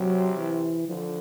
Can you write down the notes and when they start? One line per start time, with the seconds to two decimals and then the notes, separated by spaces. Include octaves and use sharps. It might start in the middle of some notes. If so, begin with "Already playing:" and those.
Already playing: C3 F#3
0.37 E3
0.88 D3 F3